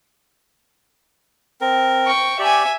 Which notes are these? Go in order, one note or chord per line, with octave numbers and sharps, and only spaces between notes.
C4 A#4
G5 C#6
G4 D5 E5 G#5